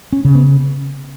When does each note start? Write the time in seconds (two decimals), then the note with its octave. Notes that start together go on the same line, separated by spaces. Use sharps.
0.13 C#4
0.25 C#3
0.35 B3